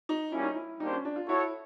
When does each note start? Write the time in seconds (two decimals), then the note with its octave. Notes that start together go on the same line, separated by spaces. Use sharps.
0.09 D#4
0.32 G3 A#3 C#4 E4
0.43 D#4
0.55 E4
0.80 G3 A#3 D4 D#4 G4 C5
0.92 C#4
1.05 D4
1.16 F4
1.28 E4 F#4 A4 C#5